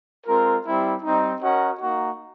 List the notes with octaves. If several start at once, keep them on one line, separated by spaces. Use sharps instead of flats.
G#3 C4 F4 A#4
G3 C4 E4
G3 C4 D#4
C#4 F#4 A#4 D#5 F#5
A#3 D#4 F#4